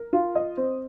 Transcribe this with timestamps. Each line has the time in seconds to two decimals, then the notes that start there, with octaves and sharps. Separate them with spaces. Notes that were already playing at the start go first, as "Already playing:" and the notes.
Already playing: A#4
0.13 F4
0.35 D#5
0.57 C4